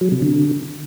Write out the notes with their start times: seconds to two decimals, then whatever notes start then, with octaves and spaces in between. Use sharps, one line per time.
0.01 F#3
0.12 C3
0.22 D3